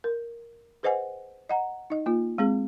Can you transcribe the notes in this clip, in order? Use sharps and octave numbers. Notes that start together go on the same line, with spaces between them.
A#4
G#4 B4 C5 D#5 F#5 G#5
D#5 F#5 A#5
D#4 D#5
A#3 F4
G#3 C4 G#4